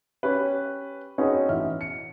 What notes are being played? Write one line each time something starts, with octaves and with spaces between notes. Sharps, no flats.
C#4 G4 B4
C4 C#4 D#4 F#4 G#4 B4
A1 E3 E5 F6
C#7